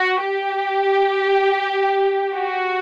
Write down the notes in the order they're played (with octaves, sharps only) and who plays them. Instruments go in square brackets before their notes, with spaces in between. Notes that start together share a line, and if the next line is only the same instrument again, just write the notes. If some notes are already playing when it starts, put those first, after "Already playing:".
Already playing: [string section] F#4
G4
F#4